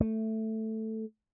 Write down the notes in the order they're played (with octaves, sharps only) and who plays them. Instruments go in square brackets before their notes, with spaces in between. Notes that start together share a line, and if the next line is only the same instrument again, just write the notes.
[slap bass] A3